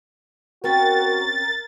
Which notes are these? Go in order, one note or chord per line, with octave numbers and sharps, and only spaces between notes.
C4 C#4 F#4 G4 A#4 A6